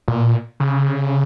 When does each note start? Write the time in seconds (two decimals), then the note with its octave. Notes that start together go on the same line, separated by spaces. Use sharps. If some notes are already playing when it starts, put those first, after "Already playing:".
0.08 A#2
0.60 C#3